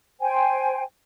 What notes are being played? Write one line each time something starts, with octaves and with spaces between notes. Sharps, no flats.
C5 G5 G#5